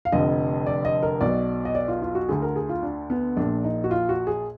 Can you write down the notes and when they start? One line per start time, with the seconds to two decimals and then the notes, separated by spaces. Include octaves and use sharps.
0.05 F5
0.12 F1 F2 D3 D#5
0.67 D5
0.85 D#5
1.03 A#4
1.21 B1 B2 D5
1.65 D#5
1.75 D5
1.88 F4
2.02 F4
2.15 F#4
2.29 D2 D3 G#4
2.42 A#4
2.56 G#4
2.69 F4
2.83 D4
3.10 B3
3.37 A#1 A#2 D4
3.64 D#4
3.84 F#4
3.91 F4
4.09 F#4
4.27 G#4